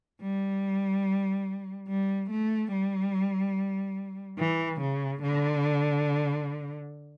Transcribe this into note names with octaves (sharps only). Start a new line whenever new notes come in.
G3
G3
A3
G3
E3
C#3
D3